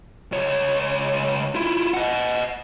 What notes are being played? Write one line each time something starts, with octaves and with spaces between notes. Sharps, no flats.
C#2 C#5
E4 F4
D#5 F#5